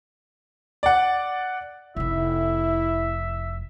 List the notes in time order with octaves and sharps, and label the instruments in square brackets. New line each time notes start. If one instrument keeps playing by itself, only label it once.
[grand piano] D5 F#5
[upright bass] F1 F3 [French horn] E4 [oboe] E5